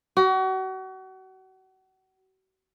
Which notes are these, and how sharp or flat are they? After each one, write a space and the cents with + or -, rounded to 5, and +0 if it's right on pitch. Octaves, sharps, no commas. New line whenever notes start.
F#4 +35